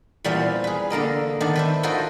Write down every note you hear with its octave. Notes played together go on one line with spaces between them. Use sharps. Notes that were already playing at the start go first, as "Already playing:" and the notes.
E2 A#2 G3 B3 C5 F5
G#4 B4
D3 A#3 A#4 D#5
D#3 B3 D4 D5
B4 C5 E5
F4 F#4 A4 A#4 C5 D#5